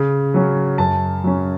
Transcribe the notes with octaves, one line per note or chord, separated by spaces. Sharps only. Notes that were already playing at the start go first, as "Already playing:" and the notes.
Already playing: C#3
F#3 C#4
F#2 A5
F#3 C#4